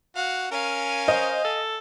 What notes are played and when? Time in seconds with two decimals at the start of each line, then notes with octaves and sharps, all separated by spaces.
0.15 F#4 F5
0.51 C#4 A#4 F5 G#5
1.08 C5 D#5
1.44 A4